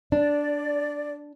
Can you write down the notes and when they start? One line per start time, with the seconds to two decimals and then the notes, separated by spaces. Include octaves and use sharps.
0.12 D4 D5